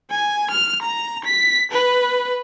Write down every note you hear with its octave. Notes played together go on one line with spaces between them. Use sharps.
G#5
F6
A#5
B6
B4